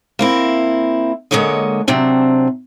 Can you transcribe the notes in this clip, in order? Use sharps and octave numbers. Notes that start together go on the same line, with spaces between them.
A#3 C4 E4
D3 G#3 A#3 D#4 C#5 D#5
C3 F#3 C4 D4